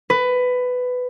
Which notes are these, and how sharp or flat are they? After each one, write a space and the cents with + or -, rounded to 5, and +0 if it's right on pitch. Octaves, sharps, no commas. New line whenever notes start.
B4 +15